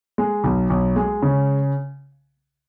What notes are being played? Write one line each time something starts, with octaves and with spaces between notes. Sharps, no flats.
G#3
B1
B1
G#3
C#3